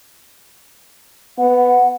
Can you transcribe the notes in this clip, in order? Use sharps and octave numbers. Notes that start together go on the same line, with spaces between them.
B3 F#5